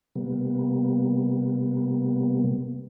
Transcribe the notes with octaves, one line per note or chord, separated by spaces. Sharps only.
C3 G3 A#3 B3